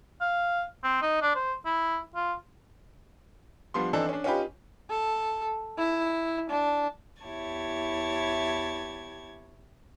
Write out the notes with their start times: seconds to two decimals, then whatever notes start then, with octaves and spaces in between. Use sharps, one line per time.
0.21 F5
0.84 C4
1.02 D#4
1.22 D4
1.35 C5
1.66 E4
2.15 F4
3.74 F3 G3 B3 D4 C6
3.93 E3 C4 D4 D#4 A4 D5
4.09 C#4 D4
4.24 C#4 D#4 F4 G4 B4
4.90 A4
5.78 E4
6.50 D4
7.22 E2 E4 G4 C#5 A5 G#6